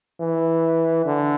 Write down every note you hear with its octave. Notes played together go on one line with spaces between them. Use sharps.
E3
D3